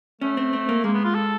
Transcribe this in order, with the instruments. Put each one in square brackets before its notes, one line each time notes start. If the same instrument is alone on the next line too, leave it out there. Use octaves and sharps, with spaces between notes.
[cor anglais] A3 [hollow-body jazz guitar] C#4
[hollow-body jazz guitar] C4
C4
A#3
[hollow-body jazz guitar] G#3 [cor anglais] A#3
[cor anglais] B3
F4
A4